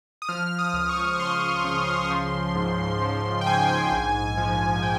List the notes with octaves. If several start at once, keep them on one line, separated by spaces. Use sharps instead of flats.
D#6
F3 F6
D#6
C#2
C#6
C#2 C6
C#3
F3
G#2
F3
G5
G#2 G#5
A#1
F3
G5